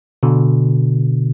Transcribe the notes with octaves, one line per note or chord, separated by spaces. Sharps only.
B2 D3